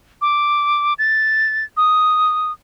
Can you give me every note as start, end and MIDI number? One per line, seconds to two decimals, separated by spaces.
0.22 0.94 86
0.98 1.64 93
1.77 2.52 87